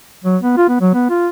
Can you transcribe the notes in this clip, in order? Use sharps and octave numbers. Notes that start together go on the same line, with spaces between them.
F#3
B3
F4
B3
F#3
B3
F4